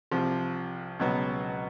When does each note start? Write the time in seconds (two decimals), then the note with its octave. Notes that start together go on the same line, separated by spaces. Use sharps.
0.11 C2 C3 F3
0.99 C#2 B2 F#3 B3